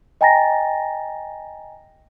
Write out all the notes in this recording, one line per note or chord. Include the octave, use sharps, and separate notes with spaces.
D#5 G5 G#5 A#5 A6 A#6